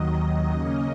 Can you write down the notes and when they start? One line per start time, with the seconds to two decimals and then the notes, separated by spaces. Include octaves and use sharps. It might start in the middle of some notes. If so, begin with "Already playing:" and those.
Already playing: D#2 D#3 F#3 D#5
0.49 C#3 A#3 C#4